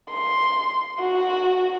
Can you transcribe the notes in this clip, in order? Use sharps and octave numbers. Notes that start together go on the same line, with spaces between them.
C6
F#4